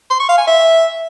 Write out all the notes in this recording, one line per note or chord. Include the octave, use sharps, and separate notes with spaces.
C6
C#6
F5
G#5
E5